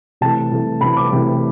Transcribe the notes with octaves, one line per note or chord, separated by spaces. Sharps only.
C3 E3 A3 A5
C3 E3 A3
C3 E3 A3 B5
D6
C3 E3 A3